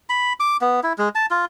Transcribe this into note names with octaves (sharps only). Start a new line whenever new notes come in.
B5
D6
B3
E4
G#3
A5
F4